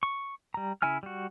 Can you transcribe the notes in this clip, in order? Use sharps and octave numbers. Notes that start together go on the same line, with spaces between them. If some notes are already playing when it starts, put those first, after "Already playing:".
C#6
G3 A#5
C#3 E4 E5 G#5 F6
G3 F#4